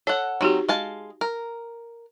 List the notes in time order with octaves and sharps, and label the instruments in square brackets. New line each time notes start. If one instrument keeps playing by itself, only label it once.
[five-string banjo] A4 F#5 [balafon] C#5
[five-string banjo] F#3 C4 [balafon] D#4 F#4 G4
[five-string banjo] G#3 F5 A5
A#4